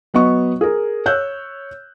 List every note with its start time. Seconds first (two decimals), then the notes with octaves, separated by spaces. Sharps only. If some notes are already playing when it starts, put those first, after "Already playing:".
0.14 F#3 B3 D#5 C#6
0.61 G#4 A#4
1.06 C#5 E6 F#6 G6